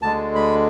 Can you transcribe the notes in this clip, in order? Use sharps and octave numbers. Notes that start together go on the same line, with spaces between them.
D2 D3 G#3 A5
B5